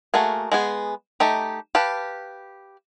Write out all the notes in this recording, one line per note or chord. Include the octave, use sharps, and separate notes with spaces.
A3 A#3 F#4 G#4
G#3 B3 G#4
A3 D#4 G4
G4 B4 F5 A5